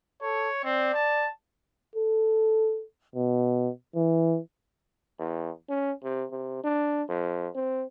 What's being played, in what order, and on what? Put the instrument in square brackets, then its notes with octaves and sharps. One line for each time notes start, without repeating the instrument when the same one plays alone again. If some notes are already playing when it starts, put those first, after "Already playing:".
[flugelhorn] A4 [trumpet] C#5
[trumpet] C4 [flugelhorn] D5
[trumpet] A5
[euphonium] A4
B2
E3
E2
C#4
C3
C3
D4
F2
C4